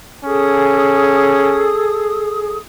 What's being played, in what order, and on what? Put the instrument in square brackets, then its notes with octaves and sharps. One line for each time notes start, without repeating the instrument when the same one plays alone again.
[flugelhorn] C#4 [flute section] G#4 A4 D#6